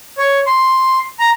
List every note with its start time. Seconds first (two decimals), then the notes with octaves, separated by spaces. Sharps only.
0.18 C#5
0.47 C6
1.19 A#5